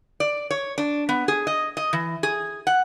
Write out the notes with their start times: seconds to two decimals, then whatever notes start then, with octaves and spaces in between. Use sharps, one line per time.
0.20 D5
0.50 C#5
0.78 D4
1.09 B3
1.28 G#4
1.47 D#5
1.77 D#5
1.93 E3
2.23 G#4
2.67 F#5